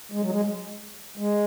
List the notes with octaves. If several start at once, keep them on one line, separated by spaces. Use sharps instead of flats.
G#3
F#3
G#3
G#3